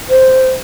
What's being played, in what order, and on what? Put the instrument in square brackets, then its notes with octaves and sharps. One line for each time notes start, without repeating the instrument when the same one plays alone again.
[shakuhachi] C5